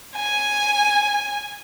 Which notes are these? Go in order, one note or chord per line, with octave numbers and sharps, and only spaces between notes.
G#5